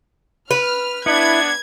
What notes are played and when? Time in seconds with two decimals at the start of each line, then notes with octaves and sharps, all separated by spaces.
0.51 B4 F6
1.06 B3 D4 E4 G#6